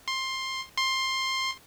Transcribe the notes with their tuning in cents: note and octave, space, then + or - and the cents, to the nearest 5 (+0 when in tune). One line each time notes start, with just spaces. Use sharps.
C6 +15
C6 +15